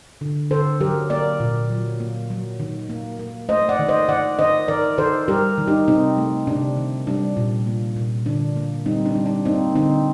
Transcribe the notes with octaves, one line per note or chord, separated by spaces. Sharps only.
D3
D3 A4 C5
F#3 G4 A#4
A#3 A#4 D5
A#2
F#3
A#3
F#3
D#3
A#3
A#3
A3 C5 D#5
D5 F#5
D#3
C5 D#5
D#3 D5 F#5
D#3 C5 D#5
D#3 A#4 D5
D#3 A4 C5
G3 G4 A#4
D#3
D#4 G4
C3 C4 D#4
A3
C3 D4
D#3
G3 D4
A#2
A#3
A#2
D3 D4
A#3
G3 C4 D#4
D4
G3
D4
A#3 C4 D#4
D3 C4 D#4